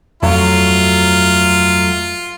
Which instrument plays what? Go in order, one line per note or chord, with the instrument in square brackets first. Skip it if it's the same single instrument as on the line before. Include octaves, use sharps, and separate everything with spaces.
[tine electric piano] F2 [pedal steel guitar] F#3 A3 F#4 [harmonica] F4